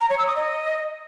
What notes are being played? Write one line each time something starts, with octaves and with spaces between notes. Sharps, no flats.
A#5
C#5
E6
D#6
D#5